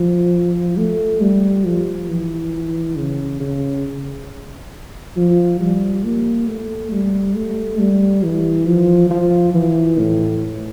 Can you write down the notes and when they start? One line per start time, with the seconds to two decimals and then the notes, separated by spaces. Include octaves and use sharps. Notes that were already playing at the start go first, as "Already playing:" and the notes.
Already playing: F3
0.77 A3
1.21 G3
1.65 F3
2.09 E3
2.97 C#3
3.40 C#3
5.16 F3
5.60 G3
6.04 A#3
6.48 A3
6.92 G3
7.36 A3
7.80 G3
8.23 E3
8.67 F3
9.10 F3
9.54 E3
9.99 A2